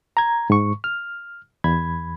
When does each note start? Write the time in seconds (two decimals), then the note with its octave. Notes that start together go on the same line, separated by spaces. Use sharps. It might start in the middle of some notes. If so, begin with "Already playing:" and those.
0.17 A#5 G#6
0.50 G#2 C#6
0.84 F6
1.64 E2 B5 G#6